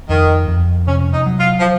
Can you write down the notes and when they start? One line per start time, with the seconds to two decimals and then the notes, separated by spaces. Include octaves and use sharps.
0.09 F2 D#3
0.48 F2
0.87 C3 C#4
1.13 D#4
1.26 F#3
1.40 F4
1.60 F3